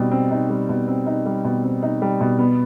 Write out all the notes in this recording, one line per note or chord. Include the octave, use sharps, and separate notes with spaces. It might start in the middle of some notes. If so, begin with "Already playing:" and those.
Already playing: B2 G3 C4 D#4
C4
D#4
G3
B2
C4
D#4
G3
B2
C4
D#4
G3
B2
B3